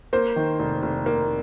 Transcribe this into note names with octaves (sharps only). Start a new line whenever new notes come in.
A#3 C5
D#3
F1
F1
A#3